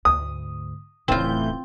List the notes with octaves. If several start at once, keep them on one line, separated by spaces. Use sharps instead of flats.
D2 G#2 D#6
D1 A2 C#3 E3 C4 F4 G6